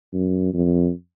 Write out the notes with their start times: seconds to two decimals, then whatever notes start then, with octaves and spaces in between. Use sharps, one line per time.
0.13 F#2
0.54 F2